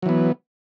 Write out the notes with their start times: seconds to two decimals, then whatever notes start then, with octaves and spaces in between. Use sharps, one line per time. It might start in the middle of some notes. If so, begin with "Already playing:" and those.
0.03 F#3
0.06 E3
0.09 B3